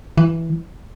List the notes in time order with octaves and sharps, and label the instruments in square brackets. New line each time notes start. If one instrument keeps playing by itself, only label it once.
[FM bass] E3